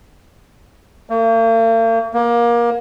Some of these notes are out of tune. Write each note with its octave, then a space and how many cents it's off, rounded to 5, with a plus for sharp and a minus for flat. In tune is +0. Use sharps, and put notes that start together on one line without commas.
A#3 -45
A#3 +25